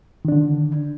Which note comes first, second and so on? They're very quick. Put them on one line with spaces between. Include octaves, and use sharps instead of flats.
D#3 D4 D3